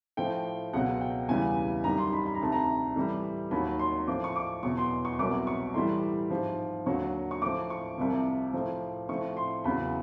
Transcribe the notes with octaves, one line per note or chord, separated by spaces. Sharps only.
A2 F3 G5
C#2 B2 F#3 F#5
G5
E2 C#3 E3 G3 G#5
F#2 D#3 G3 A#5
C6
B5
B5
A#5
D2 C3 D#3 A5
A#5
A2 E3 G3
D#2 D#3 F#3 B5
C6
A2 F3 D6
C#6
D6
E2 B2 F#3 C#6
C6
C#6
C2 B2 F#3 D6
C#6
A2 E3 G3 C6
G#2 F3
D#2 D3 F#3 C#6
C#6
A2 F3 D6
C#6
C2 C3 F3
A2 F3
A2 F3 C#6
C6
E2 C#3 F#3 B5